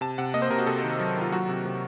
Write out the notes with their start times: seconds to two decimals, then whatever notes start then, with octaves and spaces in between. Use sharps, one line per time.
0.01 C3 A5
0.18 C3 F#5
0.34 A#3 D#5
0.42 C5
0.50 C3 A#4
0.58 F#4
0.66 C3 A4
0.84 D#3
1.00 F#3
1.16 D#3
1.21 F4
1.32 F#3 F#4
1.48 C3
1.65 C3